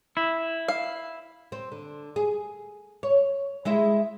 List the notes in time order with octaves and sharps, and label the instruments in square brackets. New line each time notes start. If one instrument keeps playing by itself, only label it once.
[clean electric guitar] E4
[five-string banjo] F5
[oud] C4
D3
G#4
C#5
G#3 E4 E5